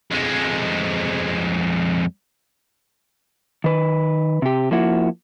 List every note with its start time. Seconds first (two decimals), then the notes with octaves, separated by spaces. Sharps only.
0.11 F2 G#3
3.64 D#3 B4
4.42 C3 G4
4.71 F3 A#3 E4 F#4